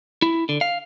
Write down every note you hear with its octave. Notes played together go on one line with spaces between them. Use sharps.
E4
D3
F5